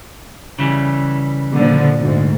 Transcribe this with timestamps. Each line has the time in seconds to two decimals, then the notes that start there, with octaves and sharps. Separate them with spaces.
0.59 C#3 E3 G3
1.53 A#2 D3 F3
1.98 D2 G#2